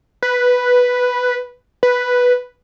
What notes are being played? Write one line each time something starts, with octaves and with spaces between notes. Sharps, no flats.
B4
B4